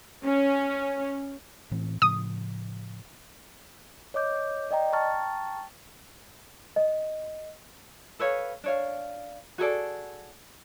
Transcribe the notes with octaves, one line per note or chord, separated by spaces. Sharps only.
C#4
A2 E3 C4
A2 C#3 F3 D#6
C#5 D#5 D6 G6
D5 D#5 G5 A#5
G5 A5 A#5 C#6 F6 A6
D#5
A4 B4 C#5 F5
D4 C#5 F5
F#4 G#4 A4 D5